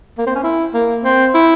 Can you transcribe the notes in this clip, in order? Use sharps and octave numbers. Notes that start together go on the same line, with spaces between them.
A#3
C4
C#4
E4
A#3
C4
E4